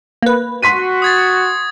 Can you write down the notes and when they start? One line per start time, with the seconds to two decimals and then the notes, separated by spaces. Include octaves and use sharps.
0.22 A#3 B4
0.62 F#4 C6 B6 D#7
1.02 D#6 G#6 A6